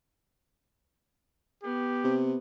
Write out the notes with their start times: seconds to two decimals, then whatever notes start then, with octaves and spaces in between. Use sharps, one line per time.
1.64 B3 G4
2.04 C3